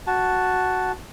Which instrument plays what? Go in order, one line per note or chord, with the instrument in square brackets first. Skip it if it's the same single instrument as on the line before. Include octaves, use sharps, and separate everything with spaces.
[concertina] F#4 A5